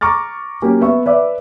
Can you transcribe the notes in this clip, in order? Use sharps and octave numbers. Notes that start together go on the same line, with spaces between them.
A#5 C#6 D6 F6 A6
F#3 A#3 C#4 G4
B3 E5 C#6
B4 D5 E5 D6